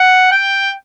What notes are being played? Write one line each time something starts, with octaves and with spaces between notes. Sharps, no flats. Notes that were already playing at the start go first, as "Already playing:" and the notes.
Already playing: F#5
G5